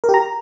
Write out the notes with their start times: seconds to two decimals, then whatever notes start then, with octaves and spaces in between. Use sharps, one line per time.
0.04 A#4
0.09 G4
0.14 A#5